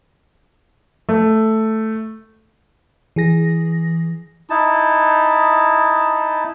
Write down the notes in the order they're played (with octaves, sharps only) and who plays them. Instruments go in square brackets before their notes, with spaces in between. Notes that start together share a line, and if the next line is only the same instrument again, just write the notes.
[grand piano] A3
[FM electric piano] E3 G#4 A#6
[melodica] D#4 E4 A5